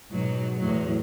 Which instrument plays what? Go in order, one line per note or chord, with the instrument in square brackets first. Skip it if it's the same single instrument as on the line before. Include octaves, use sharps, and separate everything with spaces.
[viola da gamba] G#2 B2 F#3
E2 A2 F#3